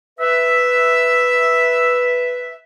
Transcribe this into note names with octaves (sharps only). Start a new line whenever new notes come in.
B4 E5